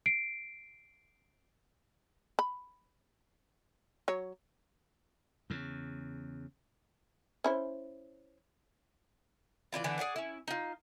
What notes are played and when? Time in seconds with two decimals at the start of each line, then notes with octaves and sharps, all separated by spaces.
0.06 C7 D7
2.39 B5
4.08 F#3 C#5
5.50 E2 C#3
7.44 C#4 E4 C5
9.73 E3 D4 E4 F4
9.84 D3 E3 B3 D4
9.99 G#4 D5 F#5
10.16 C#4 E4
10.48 D#4 F4